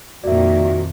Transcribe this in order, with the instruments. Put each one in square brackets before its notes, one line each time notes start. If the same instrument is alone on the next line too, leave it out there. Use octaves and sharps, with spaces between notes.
[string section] F2 A#2 D#3 [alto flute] F#4 [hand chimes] D5 E5